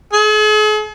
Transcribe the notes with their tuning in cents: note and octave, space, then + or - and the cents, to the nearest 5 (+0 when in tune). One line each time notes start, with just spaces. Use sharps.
G#4 +45